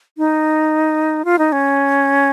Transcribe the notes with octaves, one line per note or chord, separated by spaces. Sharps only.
D#4
F4
D#4
C#4